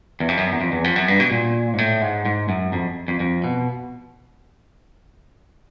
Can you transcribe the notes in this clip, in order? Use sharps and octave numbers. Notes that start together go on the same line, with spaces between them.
E2
F2
F#2
E2
F2
E2
F2
F#2
G2
B2
A#2
G#2
A2
G#2
G#2
F#2
F2
F2
F2
B2